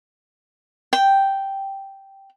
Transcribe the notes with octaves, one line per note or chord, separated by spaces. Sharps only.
G5